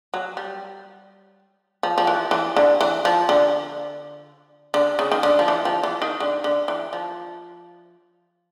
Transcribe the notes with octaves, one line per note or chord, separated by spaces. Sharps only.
F#3
G3
F3
F3
E3
E3
D3
E3
F3
D3
D3
C#3
D#3
D3
F3
E3
F3
E3
D#3
D3
D3
E3
F3